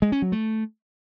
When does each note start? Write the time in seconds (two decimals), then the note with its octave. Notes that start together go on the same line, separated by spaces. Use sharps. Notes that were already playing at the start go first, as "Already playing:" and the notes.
0.02 G#3
0.12 C#4
0.22 F#3
0.32 A3